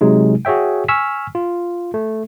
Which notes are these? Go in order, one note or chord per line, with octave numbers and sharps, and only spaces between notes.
C3 F#3 G#3 D#4
F#4 G#4 C#5 E5 G5
G#5 C#6 E6 F6 B6
F4
A3